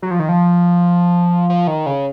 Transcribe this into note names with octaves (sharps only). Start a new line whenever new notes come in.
F#3
F3
D#3
F3
F3
D#3
C#3